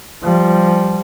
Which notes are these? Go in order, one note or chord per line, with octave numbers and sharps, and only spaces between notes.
F3 G3